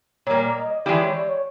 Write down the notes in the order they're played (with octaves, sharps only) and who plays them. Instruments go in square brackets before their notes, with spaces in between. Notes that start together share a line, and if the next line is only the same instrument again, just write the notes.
[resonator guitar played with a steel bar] A#2 G3 A#3 [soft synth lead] C#5
[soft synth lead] D5
D#5
D#5
[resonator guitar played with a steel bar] E3 G#3 C#4 E4 G4 [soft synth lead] D5
[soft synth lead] C#5
D5
C#5